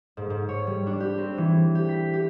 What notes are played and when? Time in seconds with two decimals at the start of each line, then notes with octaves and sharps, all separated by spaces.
0.17 G#2
0.30 G#2
0.49 C#5
0.67 G3
0.87 D4
1.00 G4
1.18 C4
1.38 E3
1.75 G4
1.89 B6
2.13 G4